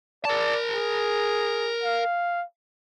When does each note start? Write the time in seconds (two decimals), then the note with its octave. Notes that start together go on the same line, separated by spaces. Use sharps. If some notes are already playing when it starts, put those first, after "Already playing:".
0.25 A#4 D5 A5
0.73 G#4
1.83 F5